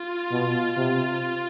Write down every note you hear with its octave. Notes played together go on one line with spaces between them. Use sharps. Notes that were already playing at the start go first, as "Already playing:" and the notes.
Already playing: F4
B2
C3